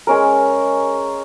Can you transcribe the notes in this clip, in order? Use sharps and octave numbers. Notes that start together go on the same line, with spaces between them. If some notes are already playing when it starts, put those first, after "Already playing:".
G#3 C#4 A#4